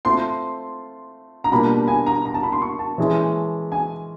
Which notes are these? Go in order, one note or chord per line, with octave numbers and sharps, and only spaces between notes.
A3 C4 F4 C6
A#5
B2 G3 A#3 D4 F4 B5
G#5
A#5
A#5
A5
B5
C6
C#6
A5
E3 G#3 C#4
G#5